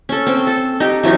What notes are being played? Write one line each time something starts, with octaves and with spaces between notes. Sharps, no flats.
C#4 A4
C4
A4
D#4 G4
E3 F#3 C#4 D#4